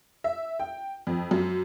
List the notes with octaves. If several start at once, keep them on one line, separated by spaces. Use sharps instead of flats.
E5
G5
F2
F#2